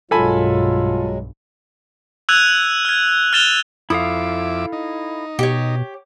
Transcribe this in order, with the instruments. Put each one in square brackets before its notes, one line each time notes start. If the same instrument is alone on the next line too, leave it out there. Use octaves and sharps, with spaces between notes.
[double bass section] B1 G2 [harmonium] F#3 G#3 [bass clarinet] F4 [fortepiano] A4 G#5 B5
[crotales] E6 F#6 G#6 D#7 F7
F6 G#6
F6 F#6 A6 E7 F7 G7
[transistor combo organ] F2 E5 D6 [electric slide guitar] E4 A4 F5 [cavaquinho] D#6
[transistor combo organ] D#4
[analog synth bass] B2 [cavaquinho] G4 C#5